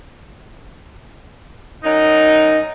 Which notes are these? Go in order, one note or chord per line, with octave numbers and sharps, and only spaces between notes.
F#2 D#4